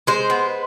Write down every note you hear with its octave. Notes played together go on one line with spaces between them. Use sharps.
G#3 C5
B3